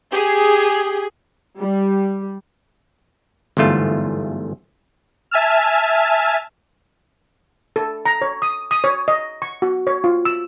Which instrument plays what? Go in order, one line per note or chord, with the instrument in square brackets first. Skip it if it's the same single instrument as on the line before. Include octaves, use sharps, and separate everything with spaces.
[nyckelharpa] G4 [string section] G#4
[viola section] G3
[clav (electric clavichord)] G1 E2 G#2 A3 F4
[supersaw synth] E5 G#5 A5 E6 F6
[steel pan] A4
A#5
C#5
D#6
D#6
C#5
D#5
C#6
F#4
C#5
F4
E6